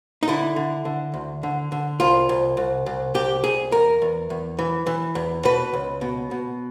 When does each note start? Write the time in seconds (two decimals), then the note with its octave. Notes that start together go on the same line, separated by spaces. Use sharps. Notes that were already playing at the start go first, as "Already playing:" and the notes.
0.23 D#4
0.28 D3 E4
0.56 D3
0.85 D3
1.14 D2
1.43 D3
1.72 D3
2.00 C2 F4
2.29 C2
2.57 C2
2.86 C2
3.14 C2 G4
3.44 C2 G#4
3.72 E2 A#4
4.02 E2
4.30 E2
4.59 E3
4.87 E3
5.15 E2
5.45 B2 B4
5.73 C#2
6.01 B2
6.31 B2